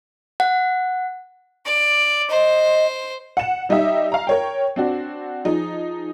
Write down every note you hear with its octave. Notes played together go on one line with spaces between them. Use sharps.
F#5
D5
C5 D#5
F#5 E7
G3 D#4 G4 D#5 E5
F5 A#5
A#4 C#5 G5
C4 D4 F#4
F3 D#4 G#4